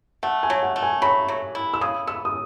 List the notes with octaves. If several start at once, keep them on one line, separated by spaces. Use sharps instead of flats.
A3 F#5
G#5
F#3
F#5
A3
G#5
F#3 B5
F#3
E4
E6
C#3 D#6
B3 E6
D#6